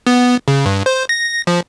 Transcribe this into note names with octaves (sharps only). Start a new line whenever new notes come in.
B3
C#3
G2
C5
A#6
F3